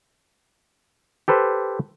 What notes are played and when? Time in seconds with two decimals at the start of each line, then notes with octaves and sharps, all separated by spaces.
1.28 G4 A4 B4 C5